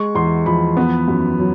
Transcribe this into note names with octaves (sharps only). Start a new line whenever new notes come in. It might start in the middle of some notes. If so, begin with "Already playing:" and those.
Already playing: G#3 C#6
E2 C6
F3 B5
B3
F#2
F#3